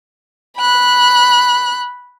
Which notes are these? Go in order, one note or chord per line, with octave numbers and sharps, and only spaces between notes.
B5 F#6